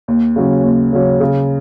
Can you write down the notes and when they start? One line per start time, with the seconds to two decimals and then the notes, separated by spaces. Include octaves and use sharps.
0.08 D#2
0.36 C#3 F#3 C#4
0.64 D#2
0.93 C#3 F#3 C#4
1.20 C#3